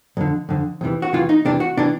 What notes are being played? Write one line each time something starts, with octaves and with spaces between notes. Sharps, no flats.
F2 D3
F2 D3
E2 C3 E3
F#4
E2 C3 E3 F4
D#4
E2 C3 E3 D4
F#4
C3 E3 D4